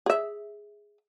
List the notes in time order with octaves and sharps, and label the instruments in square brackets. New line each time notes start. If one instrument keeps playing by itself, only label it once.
[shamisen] G#4 E5